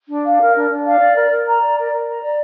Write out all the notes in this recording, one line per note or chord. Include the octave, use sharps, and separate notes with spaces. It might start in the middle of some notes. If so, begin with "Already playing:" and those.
D4
F5
A#4
D4
D4
F5
D5
A#4
A#4
A#5
D5
A#4
A#4
A#5
D5